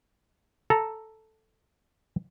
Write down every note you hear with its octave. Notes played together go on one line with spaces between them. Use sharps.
A4 A#5